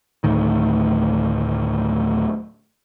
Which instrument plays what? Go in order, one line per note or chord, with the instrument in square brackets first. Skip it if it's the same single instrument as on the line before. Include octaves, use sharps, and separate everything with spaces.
[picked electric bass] D2 A2 D#3